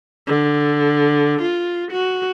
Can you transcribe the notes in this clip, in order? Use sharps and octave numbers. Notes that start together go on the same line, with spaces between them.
D3
F4
F#4